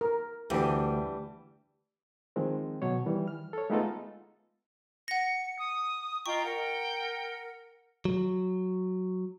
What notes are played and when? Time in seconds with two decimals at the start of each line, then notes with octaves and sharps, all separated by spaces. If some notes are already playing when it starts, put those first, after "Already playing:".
0.01 A#4
0.50 D2 E3 G3 D4 G4
2.36 D#3 F3 G#3 C4
2.82 B2 F#3 C#5
3.06 D#3 E3 G3
3.28 F6
3.53 A4 C#5
3.70 G#3 A3 B3 D#4 F4 A4
5.08 F#5 A#6 C#7
5.59 D#6
6.26 F4 D#5 G5 A#5 C#6
6.44 A#4 F#5
8.05 F#3